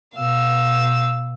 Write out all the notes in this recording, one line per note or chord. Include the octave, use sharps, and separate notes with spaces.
B2 F5 E6